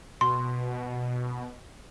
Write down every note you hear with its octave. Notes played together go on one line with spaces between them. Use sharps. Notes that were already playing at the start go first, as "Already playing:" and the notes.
B2 C6